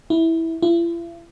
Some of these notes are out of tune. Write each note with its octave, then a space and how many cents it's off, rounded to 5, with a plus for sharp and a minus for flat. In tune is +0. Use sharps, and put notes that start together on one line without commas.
E4 -10
E4 +45